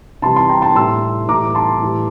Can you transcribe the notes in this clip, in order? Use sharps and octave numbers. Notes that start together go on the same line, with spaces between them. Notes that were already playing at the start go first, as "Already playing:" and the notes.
C3 E3 G3 A5 C6
A5 C6
G5 A#5
A5 C6
A2 G3 C6 E6
A2 E3 G3 A#5 D6
A5 C6
A2 E3 G3